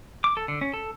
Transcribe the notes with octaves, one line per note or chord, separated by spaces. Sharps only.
D6
A4
D3
C#4
A4